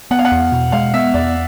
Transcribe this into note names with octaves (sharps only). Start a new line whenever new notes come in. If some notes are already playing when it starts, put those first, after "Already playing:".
B3 F#5
F5
F#5
E2
B2
G#3 F5
B3 E5
E2 D5